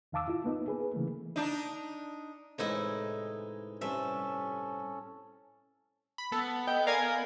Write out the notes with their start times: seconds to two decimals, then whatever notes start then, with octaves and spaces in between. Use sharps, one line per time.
0.12 E2 D#3 F5 A5 D6 E6
0.28 E4 F4
0.44 A#3 B3 D#4
0.68 G#4 B4
0.94 C#3 E3 A3 A#3
1.36 D4 D#4
2.58 A2 C3 E3 G#3 D#4 E4
3.81 G2 C3 C#4 A4 E5
6.18 B5
6.32 B3 A4
6.67 D#5 G5
6.87 A#4 D5 F5 G#5 G#6